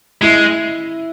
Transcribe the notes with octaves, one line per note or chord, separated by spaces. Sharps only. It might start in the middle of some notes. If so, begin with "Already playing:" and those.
G#3 E4